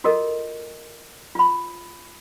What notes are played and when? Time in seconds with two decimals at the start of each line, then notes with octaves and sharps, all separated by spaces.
0.04 F4 F#4 A4 A#4 D#5
1.35 F4 B5